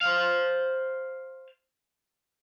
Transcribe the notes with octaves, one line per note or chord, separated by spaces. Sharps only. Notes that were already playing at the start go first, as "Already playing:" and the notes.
C5 F5